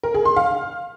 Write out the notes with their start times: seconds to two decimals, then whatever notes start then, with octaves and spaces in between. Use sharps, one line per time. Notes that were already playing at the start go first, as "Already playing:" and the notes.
0.03 A#4
0.14 G#4
0.25 C6
0.36 F5